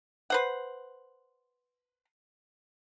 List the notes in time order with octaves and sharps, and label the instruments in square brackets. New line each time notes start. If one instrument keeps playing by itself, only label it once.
[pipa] B4 C5 F#5